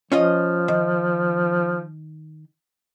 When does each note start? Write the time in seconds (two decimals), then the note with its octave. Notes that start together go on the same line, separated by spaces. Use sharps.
0.12 F3 C#4 F4 D#5
0.68 D#3